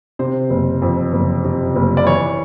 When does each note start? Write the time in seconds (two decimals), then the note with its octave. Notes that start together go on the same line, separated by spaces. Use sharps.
0.19 C3 C5
0.50 F#1
0.82 F2
1.13 F#1
1.45 C3
1.76 F#1
1.97 D5
2.06 E3 C#5